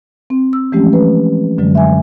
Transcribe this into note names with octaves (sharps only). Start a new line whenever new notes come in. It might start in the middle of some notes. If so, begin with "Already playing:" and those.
C4
E6
E3 F3 G#3 A3 C#4 G4
A3 B4
F#2 D3 F#3 G#3
E5 G#5